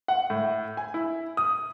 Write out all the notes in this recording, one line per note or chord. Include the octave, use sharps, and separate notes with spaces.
F#5
A2
G#5
E4
D#6